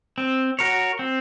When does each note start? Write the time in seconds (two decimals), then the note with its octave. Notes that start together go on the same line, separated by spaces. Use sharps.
0.18 C4
0.59 F#4 A#4 C#5
0.99 C4